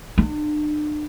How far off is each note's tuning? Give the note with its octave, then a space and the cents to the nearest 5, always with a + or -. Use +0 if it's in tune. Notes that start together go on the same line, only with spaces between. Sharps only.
D4 +40